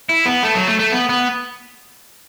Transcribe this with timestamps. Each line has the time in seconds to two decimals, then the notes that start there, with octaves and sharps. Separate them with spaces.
0.09 E4
0.25 B3
0.43 A3
0.55 F#3
0.67 A3
0.79 A3
0.92 B3
1.09 B3